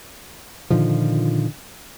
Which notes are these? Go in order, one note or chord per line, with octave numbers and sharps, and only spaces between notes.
A#2 D3 D#3 F3